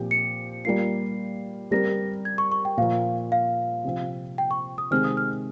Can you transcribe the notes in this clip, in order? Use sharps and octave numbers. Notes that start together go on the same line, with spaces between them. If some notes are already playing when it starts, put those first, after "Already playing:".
Already playing: A#2 F3 C4 G4
C#7
G3 A#3 F4 C7
G3 C4 G4 A#4 A#6
G#6
C#6
C#6
G5
A#2 F3 A#3 F5
F5
C3 F3 C4
G5
C#6
D#6
C3 D#3 G#3 C4 F6
D#6
F6